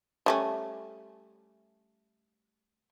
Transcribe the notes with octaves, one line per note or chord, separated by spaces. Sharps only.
G3 A3 C#4